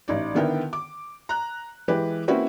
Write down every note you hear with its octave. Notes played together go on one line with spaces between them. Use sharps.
A1 D#4 D5
D3 D#3 B3 E4 A#4 G5
D6
A#5 F#6
E3 G#3 G4 B4
A#3 C4 C#4 E4 F#4 B4